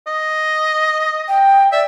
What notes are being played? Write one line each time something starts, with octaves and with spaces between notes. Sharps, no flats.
D#5
G5
D5 E5